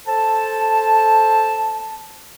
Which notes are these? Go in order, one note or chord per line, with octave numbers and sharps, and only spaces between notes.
A4 C5 A5